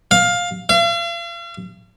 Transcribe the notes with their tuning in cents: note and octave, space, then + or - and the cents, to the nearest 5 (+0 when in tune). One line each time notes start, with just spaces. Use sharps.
F5 +15
F5 -40